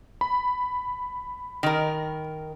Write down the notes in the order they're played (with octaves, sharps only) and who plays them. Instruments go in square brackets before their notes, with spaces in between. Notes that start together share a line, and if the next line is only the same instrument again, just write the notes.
[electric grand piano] B5
[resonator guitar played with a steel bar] D#3 A#4